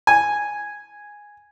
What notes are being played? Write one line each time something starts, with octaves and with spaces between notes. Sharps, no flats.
G#5